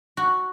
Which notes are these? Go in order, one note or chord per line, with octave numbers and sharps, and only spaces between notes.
F#4